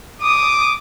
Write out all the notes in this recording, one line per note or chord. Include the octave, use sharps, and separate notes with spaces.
D6 D#6